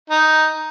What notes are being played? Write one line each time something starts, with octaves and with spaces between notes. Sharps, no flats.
D#4